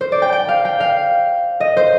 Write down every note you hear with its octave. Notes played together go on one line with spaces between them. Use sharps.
C5
D5
G5
G5
F5
G5
F5
D#5
C5